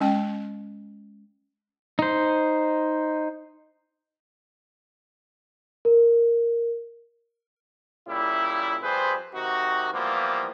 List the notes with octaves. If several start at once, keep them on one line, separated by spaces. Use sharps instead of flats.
G#3 C#4 G5
D#4 C5
A#4
A#2 C#3 G3 E4
F2 G3 G#4 B4 C5
C3 D#3 D#4 F#4
E3 F3 G3 A#3 B3 F4